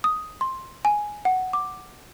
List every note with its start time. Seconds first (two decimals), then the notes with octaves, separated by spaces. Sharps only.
0.04 D#6
0.41 C6
0.85 G#5
1.25 F#5
1.53 D6